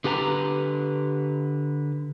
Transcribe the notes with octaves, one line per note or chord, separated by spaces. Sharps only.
D3 G4 B4 A5 A#5